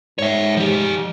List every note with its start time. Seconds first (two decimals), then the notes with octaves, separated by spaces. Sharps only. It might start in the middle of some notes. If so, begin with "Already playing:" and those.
0.19 G#2 C#5 E5
0.57 F3 G4